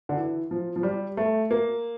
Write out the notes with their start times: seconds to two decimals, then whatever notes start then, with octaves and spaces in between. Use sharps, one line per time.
0.09 D3
0.17 E3
0.51 F3
0.76 F3
0.83 G3
1.17 A3
1.51 A#3